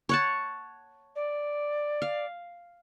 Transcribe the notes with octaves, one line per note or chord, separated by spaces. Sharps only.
C#5 F#5 A5
D5
F5